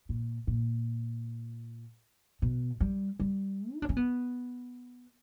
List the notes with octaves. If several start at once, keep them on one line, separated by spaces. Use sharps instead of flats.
A#2
A#2
B2
G3
G3
E4
D4
C#4
B3